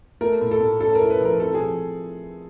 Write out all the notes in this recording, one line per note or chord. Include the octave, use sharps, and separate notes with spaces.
A3 A#4
A2
A4
A2
C#4 A4
A#4
E4
B4
F3 A#4
C4 A4
G#4
F3